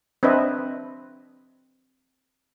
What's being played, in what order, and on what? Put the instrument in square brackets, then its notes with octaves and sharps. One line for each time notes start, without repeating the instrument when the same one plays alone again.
[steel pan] C4 D4 B4 D#5 E5